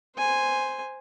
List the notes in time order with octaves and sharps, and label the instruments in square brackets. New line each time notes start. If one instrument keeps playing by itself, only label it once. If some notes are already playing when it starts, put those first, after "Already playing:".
[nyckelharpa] C5 G#5